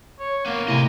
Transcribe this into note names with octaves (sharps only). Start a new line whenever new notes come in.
C#5
A#3 B3 D4
A2 C3 D#5 G#5